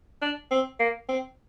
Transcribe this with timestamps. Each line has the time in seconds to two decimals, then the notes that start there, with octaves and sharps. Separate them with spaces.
0.22 D4
0.51 C4
0.80 A#3
1.09 C4